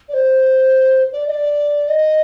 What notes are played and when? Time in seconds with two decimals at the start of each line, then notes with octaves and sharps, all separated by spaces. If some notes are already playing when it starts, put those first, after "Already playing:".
0.09 D5
0.14 C5
1.13 D5
1.28 D#5
1.31 D5
1.88 D#5